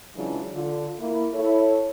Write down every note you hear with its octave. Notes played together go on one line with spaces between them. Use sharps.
C#3 E3 F#3 G#3 D4 F4
D3 F4
A#3 E4
E4 A4 C#5